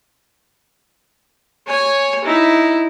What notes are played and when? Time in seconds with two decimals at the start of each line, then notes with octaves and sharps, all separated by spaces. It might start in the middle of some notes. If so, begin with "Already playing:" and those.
1.67 C#5 G#5
2.24 D#4 E4